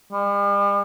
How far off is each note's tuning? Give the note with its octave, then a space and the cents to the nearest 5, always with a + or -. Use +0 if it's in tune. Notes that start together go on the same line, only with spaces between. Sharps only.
G3 +45